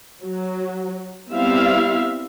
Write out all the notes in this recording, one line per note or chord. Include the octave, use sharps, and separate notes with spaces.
F#3
G3 B3 C4 E4 E5 F5